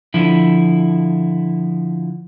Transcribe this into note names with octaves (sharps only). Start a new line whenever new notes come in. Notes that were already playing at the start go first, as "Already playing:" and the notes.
D3 F3 E4